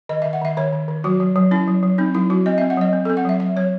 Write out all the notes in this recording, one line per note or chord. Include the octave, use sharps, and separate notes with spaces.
D#3 D#5
D#3 E5
F#5
D#3 E5
D#3 C#5
D#3
D#3
F#3 F#4
F#3
F#3
C#4 E4
F#3
F#3
C4 D#4
F#3 E4
F#3 F#4
C4 D#5
C4 E5
F#5
F#3 D#5
C4
C4 A4
F#5
F#3 E5
F#3 E5
F#3 C#5